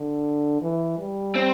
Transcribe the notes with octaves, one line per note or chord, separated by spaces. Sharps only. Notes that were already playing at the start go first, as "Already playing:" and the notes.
Already playing: D3
E3
G3
C4